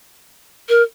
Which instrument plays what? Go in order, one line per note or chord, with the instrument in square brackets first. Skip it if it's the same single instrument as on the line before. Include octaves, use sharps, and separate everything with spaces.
[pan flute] A#4